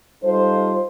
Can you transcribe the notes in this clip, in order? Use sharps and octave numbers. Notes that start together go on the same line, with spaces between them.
G3 D#4 F4 A4 C5